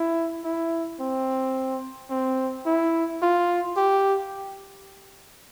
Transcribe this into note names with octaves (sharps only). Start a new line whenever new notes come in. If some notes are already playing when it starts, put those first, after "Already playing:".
Already playing: E4
E4
C4
C4
E4
F4
G4